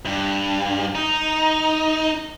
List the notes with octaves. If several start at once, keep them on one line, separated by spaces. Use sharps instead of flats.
G2
D#4